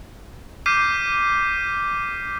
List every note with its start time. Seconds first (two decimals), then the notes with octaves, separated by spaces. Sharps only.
0.66 D6 F6 G6 B6 C7 D#7